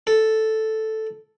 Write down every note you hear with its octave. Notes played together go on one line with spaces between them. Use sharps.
A4